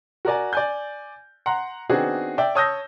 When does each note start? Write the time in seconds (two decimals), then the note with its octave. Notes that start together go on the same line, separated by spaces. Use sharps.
0.25 F#4 A#4 D5 G#5
0.53 D5 G#5 G6
1.46 F#5 A#5 C6
1.89 D#3 B3 C4 D4 F#4 G#4
2.38 D5 E5 G5
2.55 C#5 A5 D#6 E6 G6 A#6